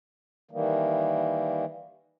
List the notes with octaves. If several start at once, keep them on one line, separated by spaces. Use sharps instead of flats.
D#3 E3 G3 A#3